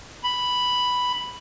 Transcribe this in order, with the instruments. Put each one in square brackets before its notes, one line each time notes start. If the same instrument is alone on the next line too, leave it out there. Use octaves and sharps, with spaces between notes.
[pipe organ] B5